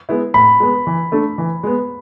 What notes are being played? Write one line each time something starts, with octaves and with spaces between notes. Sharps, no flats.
G#3 B3 E4
A2 B5
G#3 B3
E3
A3 D4 A4
E3
G#3 B3